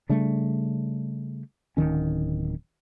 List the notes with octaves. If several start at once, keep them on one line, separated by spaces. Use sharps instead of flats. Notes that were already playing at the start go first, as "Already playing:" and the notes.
C#3 G3 A3 D4
D1 C2 D#3 C#4